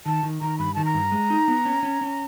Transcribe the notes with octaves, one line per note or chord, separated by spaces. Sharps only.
D#3 A5
D#3
D#3 A#5
G2 B5
D#3 A5
A#5
G2
G#3
D#4
B3
C#4
C#4
C#4